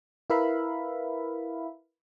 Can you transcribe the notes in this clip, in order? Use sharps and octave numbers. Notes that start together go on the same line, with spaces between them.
E4 A#4 B4 E5 F5 B5